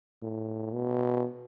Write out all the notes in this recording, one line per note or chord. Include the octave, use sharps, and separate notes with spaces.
A2
B2